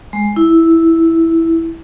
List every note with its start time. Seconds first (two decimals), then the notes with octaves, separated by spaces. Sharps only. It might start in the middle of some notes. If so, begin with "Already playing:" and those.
0.13 G#3
0.36 E4